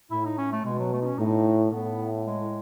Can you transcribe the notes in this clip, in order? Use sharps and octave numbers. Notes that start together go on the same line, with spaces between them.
A2 E4
D#4
C#4
A3
B2 G#3
F#3
A3
D#4
C#4
A2 D#4
A3
A2 B3
G#3